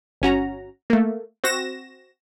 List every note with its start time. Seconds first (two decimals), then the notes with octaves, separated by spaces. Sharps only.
0.22 G1 C#4 F#4 A#5
0.90 A3 A#3
1.44 C4 F#4 A#6 E7